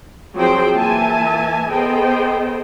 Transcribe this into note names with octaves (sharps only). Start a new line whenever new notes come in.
F3 F#3 C4 G#4 C5 G5
E3 A#3 E5 G#5 A5
B3 G#4 A4 C5 D#5 G5